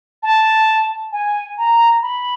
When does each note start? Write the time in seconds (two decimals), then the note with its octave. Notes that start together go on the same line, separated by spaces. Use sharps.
0.23 A5
1.12 G#5
1.58 A#5
2.02 B5